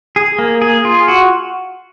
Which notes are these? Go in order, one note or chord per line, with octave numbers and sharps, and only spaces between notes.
G#4
A#3
G#4
F4
F#4